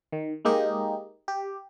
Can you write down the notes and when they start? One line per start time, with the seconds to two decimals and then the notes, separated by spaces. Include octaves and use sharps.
0.12 D#3
0.45 G#3 A#3 D#4 G4 D#5
1.28 G4